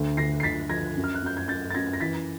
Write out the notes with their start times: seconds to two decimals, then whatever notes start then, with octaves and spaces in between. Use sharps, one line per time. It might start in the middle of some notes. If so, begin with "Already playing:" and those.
Already playing: D2
0.17 D2 A#6 C7
0.40 C7
0.43 D2 A6 B6
0.70 F3 G#6 A#6
0.97 F#2
1.04 F6
1.15 F#6
1.23 F#2 G6
1.37 G#6
1.48 F#2 G6 A6
1.70 A6
1.74 F#2 G#6 A#6
1.93 A#6
2.00 E3 A6 B6